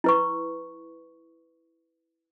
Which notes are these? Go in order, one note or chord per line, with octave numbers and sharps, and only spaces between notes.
E4 B4 C#6